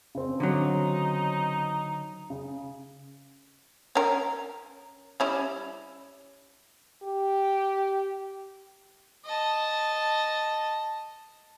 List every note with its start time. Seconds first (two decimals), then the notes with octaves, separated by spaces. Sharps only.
0.15 C#3 C4
0.40 D3 F#3 D#4
2.30 C#3
3.95 C#4 A#4
5.20 G3 C#4 E4
7.03 G4
9.25 D#5 A5